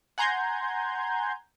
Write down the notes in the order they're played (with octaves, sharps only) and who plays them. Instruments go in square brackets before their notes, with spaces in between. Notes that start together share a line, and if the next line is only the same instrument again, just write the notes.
[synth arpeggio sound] F#5 G#5 A#5 C6 G6 G#6